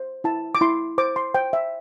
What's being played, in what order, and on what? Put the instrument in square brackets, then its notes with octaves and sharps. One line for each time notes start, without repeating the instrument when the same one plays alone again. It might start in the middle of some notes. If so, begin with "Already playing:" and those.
Already playing: [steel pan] C5
E4 A5
D6
E4 C6
C5 D6
C6
C5 G5
E5